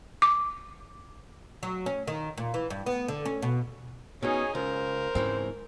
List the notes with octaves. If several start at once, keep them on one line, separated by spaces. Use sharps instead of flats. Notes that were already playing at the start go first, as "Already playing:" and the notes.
D6
F#3
C#4
D#3
A#2
E3
G2
B3
D3
C#4
B2
B2 C#4 D#4 G#4 C#5 G#5
C#2 A#4 C5
G#2 C#3 E3 C4